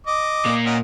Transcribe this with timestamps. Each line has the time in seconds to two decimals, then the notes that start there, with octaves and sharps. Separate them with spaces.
0.07 D#5 D6
0.46 A#2 A#3
0.66 C#4 D#5 F#5